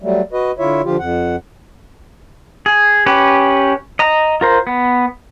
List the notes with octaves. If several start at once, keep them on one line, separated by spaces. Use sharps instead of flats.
F#3 G3 A3
F#4 B4 D#5
D3 E4 F4 C#5 E5
D3 F3 F4 G4
F2 F#5
G#4
C#4 G4 B4
D#5 A#5
F4 A#4 C5
B3